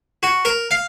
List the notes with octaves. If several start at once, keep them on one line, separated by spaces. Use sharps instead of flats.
F#4
A#4
F5